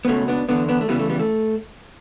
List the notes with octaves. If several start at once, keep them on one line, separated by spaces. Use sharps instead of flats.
B3
C#2 B2 A3 C#4
B3 D4
E2 D3 B3 D4
B3 D4
A3
E2 C#3 E3 G3 B3
A3
G3 B3
A3